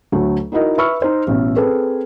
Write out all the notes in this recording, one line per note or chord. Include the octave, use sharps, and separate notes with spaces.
D2 F#3 A3
D#4 E4 F#4 A#4 D#5
B4 E5 B5 C#6 E6 F6
D#4 C5
A1 B2
C4 G#4 A4 B4